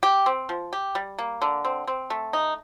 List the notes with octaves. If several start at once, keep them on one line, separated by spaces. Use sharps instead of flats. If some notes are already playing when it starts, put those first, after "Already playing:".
G4
C4
F3
G4
G3
A#3
D3
C4
C4
A3
D#4